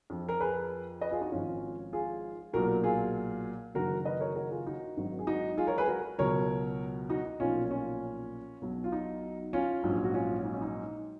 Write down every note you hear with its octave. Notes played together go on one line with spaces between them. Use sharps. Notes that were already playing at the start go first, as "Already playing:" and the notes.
F2 F3
A#4
G#4 B4
B4 D#5
F4 G#4
D#4 F#4
G#1 G#2 F3 C#4 F4
F4 G#4
B1 A#2 F#3 F#4 A#4
F4 G#4
F#1 F#2 D#3 F#4 A#4
B4 D#5
A#4 C#5
F#4 A#4
F4 G#4
D#4 F#4
G#1 G#2 D#3 F#3
G#4
D#4 F#4
F4 G#4
A#4 C#5
G#4 B4
F#4 A#4
C#2 B2 F#3 A#4 C#5
D#4 F#4
D#4
B1 A#2 F3 C#4 F4
C#4 F4
B1 B2 F#3
F4
D#4
C#4 F4
A#1 G#2 F#3
F#4
C#4 F4
D#4
C#4
D#4